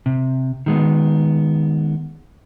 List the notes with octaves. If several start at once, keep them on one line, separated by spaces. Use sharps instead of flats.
C3
D#3 G#3 B3